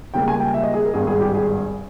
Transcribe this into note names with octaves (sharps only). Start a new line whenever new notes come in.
C#2 C#3 G3 A#3 G5
G#5
G5
E5
D#5
G#4
A#4
G#1 G2 G3 B3 G#4
G#4
G4
G#4